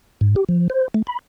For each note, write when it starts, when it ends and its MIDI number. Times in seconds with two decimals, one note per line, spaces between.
0.21 0.35 44
0.36 0.44 67
0.49 0.68 53
0.70 0.88 72
0.94 1.02 57
1.07 1.19 83